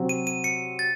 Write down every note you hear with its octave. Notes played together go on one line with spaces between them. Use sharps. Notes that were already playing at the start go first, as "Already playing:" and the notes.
Already playing: C3 F#3 C4
D#7
D#7
C#7
A6